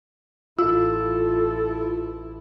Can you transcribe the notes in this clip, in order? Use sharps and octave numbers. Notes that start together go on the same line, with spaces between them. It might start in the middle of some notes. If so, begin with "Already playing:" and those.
A1 E4 F4 A4 E6